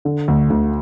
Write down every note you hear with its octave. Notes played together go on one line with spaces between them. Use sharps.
D3
D2
D2